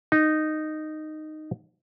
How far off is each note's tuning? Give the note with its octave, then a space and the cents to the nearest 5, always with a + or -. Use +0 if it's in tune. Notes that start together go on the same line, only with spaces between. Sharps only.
D#4 -10